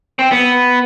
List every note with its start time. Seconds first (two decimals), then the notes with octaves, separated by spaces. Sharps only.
0.19 C4
0.32 B3